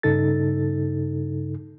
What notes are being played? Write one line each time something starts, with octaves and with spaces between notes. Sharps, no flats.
G2 C#3 D#4 A4 A6